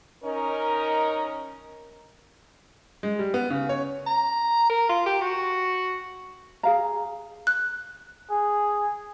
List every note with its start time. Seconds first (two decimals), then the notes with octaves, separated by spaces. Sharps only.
0.24 C#4 D#4 A#4
3.03 G#3
3.19 G3
3.34 B3
3.50 C#3
3.69 C#5
4.07 A#5
4.70 A#4
4.89 F4
5.06 G4
5.21 F#4
6.63 G#4 F5 A#5
7.47 F#6
8.30 G#4